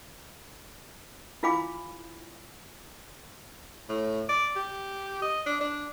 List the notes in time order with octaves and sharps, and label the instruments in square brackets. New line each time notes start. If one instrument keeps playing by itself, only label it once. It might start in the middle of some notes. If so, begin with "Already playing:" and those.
[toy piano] E4 F4 F5 G#5 B5 D6
[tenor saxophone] A2
D5
G4
D#5
D4
D4